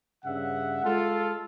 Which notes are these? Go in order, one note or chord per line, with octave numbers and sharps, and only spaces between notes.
G2 C#3 E5 F#5
G#3 F4 A4